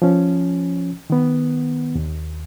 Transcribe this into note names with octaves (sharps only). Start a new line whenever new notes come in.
F3 C#4
D#3 B3
D#2